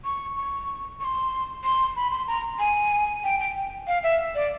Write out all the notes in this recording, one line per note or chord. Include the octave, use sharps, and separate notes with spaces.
C#6
C#6
C#6
C6
C6
B5
C6
A#5
G#5
G5
G5
F5
E5
D5